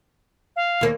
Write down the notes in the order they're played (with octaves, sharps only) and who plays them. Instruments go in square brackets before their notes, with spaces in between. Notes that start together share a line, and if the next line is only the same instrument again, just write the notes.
[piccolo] F5
[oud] D#2 A#3 C#5